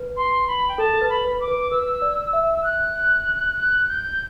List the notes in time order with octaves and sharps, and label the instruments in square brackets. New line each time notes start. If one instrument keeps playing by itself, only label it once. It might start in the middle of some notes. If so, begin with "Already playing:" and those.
Already playing: [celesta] B4
[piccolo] C6
B5
G5
[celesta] A4 [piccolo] A5
[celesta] A4
B4
[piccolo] B5
[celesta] B4
[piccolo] D6
[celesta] B4
[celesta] B4 [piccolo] E6
[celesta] D5
E5
[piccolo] E6
F#6
F#6
G6